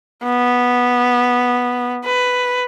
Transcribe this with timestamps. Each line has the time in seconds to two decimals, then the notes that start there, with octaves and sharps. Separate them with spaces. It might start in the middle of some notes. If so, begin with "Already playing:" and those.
0.24 B3
2.04 B4